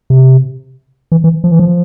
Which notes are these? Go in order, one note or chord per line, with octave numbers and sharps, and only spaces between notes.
C3
E3
E3
F3
E3
F3